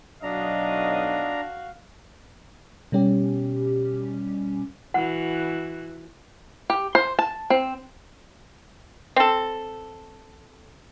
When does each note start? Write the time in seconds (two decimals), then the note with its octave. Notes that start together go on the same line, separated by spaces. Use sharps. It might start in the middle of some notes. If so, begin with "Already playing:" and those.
0.23 B1 F#3 D4 F#4 D#5 F5 A#5
2.92 B2 G3 C#4 G4
4.94 E3 F#4 F#5
6.70 G4
6.95 C5
7.19 A5
7.50 C4
9.16 C4 A4